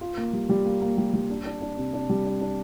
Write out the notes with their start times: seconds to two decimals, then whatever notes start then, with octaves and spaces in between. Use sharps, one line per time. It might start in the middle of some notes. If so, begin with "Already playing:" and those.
0.01 F4
0.17 A#3
0.33 G3
0.49 G3
0.66 A#3
0.81 A#3
0.97 G3
1.13 G3
1.30 D4
1.45 D4
1.61 D4
1.77 C3
1.93 D4
2.09 G3
2.25 D4
2.41 D4